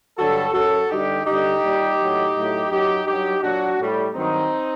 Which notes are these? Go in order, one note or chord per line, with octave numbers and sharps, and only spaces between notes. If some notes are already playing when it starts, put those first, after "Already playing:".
G2 D3 F#3 F#4 A4
F#2 F#3 F#4 A4
G2 D3 G3 D#4 G4
G2 D3 G3 D#4 G4
A#2 G3
A2 F#3
A2 F#3
F#2 F#3 D#4 G4
G2 F#3 D#4 G4
A#2 F#3 D4 F#4
A2 G3
G2 D#3 F#3 C4 D#4